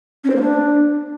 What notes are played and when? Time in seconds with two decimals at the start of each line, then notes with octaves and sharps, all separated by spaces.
0.24 C#4
0.30 C5
0.36 A#3
0.42 D4